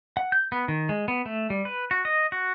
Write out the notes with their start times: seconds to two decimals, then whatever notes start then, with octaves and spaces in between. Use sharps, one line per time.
0.17 F#5
0.32 G6
0.52 B3
0.68 D#3
0.89 G#3
1.08 B3
1.26 A3
1.50 G3
1.65 B4
1.91 F#4
2.05 D#5
2.32 F#4